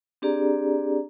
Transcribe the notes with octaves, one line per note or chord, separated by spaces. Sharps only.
C4 D4 G4 G#4 D5 A#5